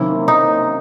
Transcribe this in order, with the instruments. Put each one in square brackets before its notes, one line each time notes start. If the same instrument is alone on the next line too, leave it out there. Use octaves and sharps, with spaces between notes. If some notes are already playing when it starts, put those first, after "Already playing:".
Already playing: [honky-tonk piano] C3 D#3 F#3 A#3 C#4 [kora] E4
[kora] D#4